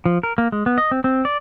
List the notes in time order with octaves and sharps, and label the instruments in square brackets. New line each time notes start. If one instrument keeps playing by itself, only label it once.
[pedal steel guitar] F3
A#4
A#3
G#3
B3
D#5
C4
C4
D5